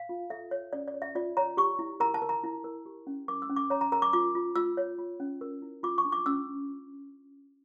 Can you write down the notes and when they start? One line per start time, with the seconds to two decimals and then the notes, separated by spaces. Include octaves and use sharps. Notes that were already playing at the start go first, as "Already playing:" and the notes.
Already playing: F5
0.09 F4
0.30 A4 E5
0.51 C#5
0.73 C#4 D5
0.88 D5
0.94 C#5
1.02 E5
1.15 F4 D5
1.37 C#5 A#5
1.57 G4 C#6
1.79 E4
2.00 A#4 A#5
2.14 A5
2.22 A#4
2.29 A#5
2.44 E4
2.64 A#4
2.86 G4
3.07 C#4
3.28 A#4 D6
3.42 E6
3.49 C#4
3.56 D6
3.70 C#5 A#5
3.81 A#5
3.92 A#4 A#5
4.02 D6
4.13 F4 D6
4.35 F4
4.56 F4 E6
4.77 C#5
4.98 F4
5.20 C#4
5.41 A#4
5.62 E4
5.83 F4 D6
5.98 C#6
6.05 D4
6.12 D6
6.26 C#4 E6